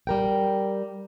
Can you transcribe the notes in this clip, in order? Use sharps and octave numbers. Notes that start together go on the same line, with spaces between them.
G3 A#4 G5